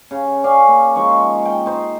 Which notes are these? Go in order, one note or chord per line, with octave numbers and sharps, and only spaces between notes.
C#3
C#4 D5 F5 G#5
A#3
F3 G#3 D#4 C#6
G5
D#4 C5